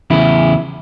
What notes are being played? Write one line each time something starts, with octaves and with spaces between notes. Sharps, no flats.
E2 C#3 E4